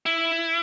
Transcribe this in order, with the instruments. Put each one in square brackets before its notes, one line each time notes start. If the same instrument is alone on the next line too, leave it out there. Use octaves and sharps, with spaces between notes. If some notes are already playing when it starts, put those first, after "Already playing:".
[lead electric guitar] E4